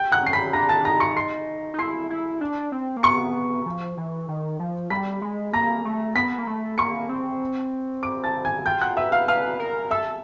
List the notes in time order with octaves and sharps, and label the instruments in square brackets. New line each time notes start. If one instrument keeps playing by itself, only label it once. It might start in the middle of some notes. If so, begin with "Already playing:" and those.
Already playing: [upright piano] G5 G6
F#5 F#6
[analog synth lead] C#4 [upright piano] C7
[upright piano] B5 B6
[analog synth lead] D4 [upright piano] A#5 A#6
[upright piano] A5 A6
[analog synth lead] D4
[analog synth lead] D#4 [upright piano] A#5 A#6
[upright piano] C#6 C#7
C6 C7
[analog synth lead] D#4
[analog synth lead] E4 [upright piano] C6 C7
[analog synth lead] E4
D4
C4
A#3
[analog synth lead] B3 [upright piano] C#6 C#7
[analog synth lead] F3
E3
D#3
F3
[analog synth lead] G3 [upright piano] B5 B6
[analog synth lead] G#3
[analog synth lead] A#3 [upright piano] A#5 A#6
[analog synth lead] A3
[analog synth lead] B3 [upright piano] B5 B6
[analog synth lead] A#3
A3
[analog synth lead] A#3 [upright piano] C#6 C#7
[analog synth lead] C4
[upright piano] D6 D7
A5 A6
G#5 G#6
[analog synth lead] F4 [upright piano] G5 G6
[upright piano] F#5 F#6
[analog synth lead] B4 [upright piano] E5 E6
[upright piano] F5 F6
[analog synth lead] B4 [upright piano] F5 F6
[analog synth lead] A#4
[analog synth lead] A4 [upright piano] E5 E6